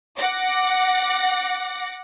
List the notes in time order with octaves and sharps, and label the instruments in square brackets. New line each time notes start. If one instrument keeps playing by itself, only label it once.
[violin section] F#5 D6 A#6